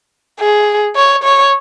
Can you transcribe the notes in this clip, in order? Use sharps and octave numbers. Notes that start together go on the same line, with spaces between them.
G#4
C#5
C#5